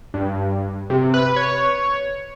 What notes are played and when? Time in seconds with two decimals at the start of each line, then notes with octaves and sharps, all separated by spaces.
0.14 G2
0.90 C3
1.14 B4
1.36 C#5